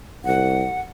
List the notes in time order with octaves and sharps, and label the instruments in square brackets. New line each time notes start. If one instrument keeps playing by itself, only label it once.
[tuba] C2 [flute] F#5